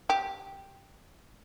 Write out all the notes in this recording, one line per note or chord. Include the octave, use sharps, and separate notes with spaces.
G4